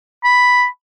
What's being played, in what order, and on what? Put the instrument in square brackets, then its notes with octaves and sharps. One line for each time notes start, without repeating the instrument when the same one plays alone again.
[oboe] B5